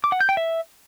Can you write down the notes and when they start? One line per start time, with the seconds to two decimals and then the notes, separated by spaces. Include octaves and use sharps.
0.04 D6
0.12 F#5
0.21 G6
0.29 G5
0.37 E5